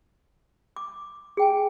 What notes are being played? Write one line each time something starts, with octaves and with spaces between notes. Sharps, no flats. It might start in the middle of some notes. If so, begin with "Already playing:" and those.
D6
G#4 G5 G#5